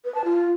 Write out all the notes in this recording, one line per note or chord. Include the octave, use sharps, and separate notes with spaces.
B4
A5
F4